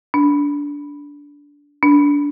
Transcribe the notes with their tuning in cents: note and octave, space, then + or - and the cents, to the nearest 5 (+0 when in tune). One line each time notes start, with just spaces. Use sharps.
D4 -20
D4 -20